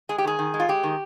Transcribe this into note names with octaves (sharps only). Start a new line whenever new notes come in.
G#3 G#4
G4
D#3 G#4
D#3
G#3
F4
G#3 G4
D#3